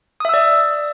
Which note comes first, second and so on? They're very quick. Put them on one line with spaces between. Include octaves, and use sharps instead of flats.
D#6 E5 E6 D5